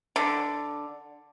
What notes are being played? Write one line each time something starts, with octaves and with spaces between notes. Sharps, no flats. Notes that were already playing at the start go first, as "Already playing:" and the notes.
D3